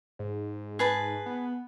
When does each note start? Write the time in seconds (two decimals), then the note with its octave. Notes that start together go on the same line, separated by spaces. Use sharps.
0.19 G#2
0.79 G#4 B4 A5
1.26 B3